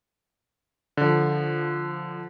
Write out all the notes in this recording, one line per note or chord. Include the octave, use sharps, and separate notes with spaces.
D3 F3